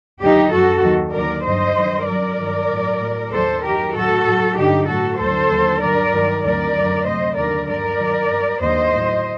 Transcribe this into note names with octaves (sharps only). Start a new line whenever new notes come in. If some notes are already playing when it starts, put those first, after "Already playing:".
D#2 D3 F#3 D#4 G4
F#2 F#3 F#4 A4
D#2 D#3 F#3
D#2 D3 F#3 A#4 D5
G2 D3 F#3 C5 D#5
G2 D#3 F#3
F#2 F#3 A#4 D5
G2 D#3 F#3
A2 F#3
A2 F#3
D#2 D#3 F#3 A4 C5
F#2 D#3 F#3 G4 A#4
A2 F#3 F#4 A4
A2 F#3
G2 D3 F#3 D#4 G4
A2 F#3 F#4 A4
D2 D3 F#3 A4 C5
D#2 D3 F#3
G2 D3 F#3 A#4 D5
G2 D#3 F#3
D2 C3 D#3 F#3 A#4 D5
F#2 D3 F#3
D2 C3 F#3 C5 D#5
D#2 D3 F#3 A#4 D5
G2 D3 F#3 A#4 D5
G2 D#3 F#3
G2 F#3
D#2 D3 F#3 C5 D#5
A2 F#3